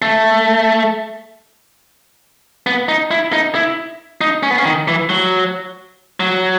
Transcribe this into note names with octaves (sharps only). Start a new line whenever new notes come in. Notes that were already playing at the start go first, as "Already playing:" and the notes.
A3
B3
D#4
E4
D#4
E4
D#4
C#4
B3
C#4
D#3
E3
F#3
F#3